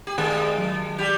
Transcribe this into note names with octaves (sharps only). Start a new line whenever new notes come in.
G4
D#3 G#3 G#4
F#3
G3 G4